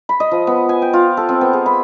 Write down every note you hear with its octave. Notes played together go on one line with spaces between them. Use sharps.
B5
D#5
F3
B3
G#5
G5
F4
A4
C4
B3
G#4
B5